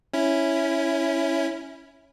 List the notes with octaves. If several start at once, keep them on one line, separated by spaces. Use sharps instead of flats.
C#4 E4